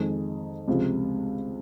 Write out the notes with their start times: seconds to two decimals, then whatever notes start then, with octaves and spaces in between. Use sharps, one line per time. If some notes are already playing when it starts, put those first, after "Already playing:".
Already playing: F2 D#3 G#3
0.68 C#2 C3 F3